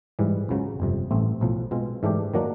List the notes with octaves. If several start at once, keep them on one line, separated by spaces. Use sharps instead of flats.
G#2 E3 G3
C#2 C#3 F#3
G1 F2 C3
A1 G2 E3 A3 C4
B1 A2 F3
B2 G#3 C4 F4
G#2 E3 A3 D4 G4
D#3 F#3 A#3 D4